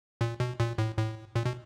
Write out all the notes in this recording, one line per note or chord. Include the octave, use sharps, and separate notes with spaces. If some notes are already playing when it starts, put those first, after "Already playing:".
A#2
B2
A#2
A2
A2
A#2
B2